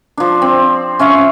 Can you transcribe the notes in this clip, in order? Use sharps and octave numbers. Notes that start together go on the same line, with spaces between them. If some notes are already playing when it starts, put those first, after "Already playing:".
F3 D4
C4
C#4 E5 F5 C#6